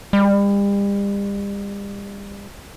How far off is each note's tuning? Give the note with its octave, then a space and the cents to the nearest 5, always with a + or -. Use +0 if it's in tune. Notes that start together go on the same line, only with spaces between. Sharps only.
G3 +40